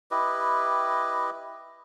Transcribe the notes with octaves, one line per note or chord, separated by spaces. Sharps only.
E4 G4 B4 D#5